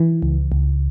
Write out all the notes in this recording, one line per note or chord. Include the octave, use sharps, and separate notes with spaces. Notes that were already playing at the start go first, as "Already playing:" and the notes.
Already playing: E3
C#2
C#2